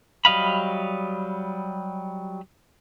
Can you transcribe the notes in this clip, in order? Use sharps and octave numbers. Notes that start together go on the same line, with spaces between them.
F#3 G3 D#5 F5 B5